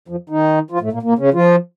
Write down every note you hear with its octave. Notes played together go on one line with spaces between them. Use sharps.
F2 F3
D#3 D#4
F3 F4
A2 A3
A#2 A#3
A#2 A#3
C#3 C#4
F3 F4